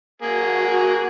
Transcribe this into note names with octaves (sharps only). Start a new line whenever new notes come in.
A#3 F#4 G#4